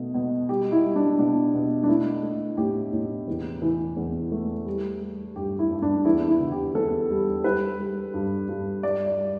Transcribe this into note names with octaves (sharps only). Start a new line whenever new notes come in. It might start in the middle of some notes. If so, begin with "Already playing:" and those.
Already playing: B2 A3
B2
G3 G4
E4
G3
D4
B2 D4
B2
D4
A3 E4
A3
A2 G4
A2
E2
E3
E2
A3
G3
G3
G2 G4
E4
G2
D4
E2 E4
E4
D3
G4
E2 A4
G3
G3 B4
G3
G2
G2
G3 D5
D5
G3